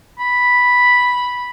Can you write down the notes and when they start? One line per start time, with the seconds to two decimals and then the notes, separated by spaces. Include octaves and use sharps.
0.20 B5